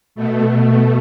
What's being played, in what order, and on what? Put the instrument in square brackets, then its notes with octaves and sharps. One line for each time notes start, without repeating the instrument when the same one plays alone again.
[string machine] B2 A3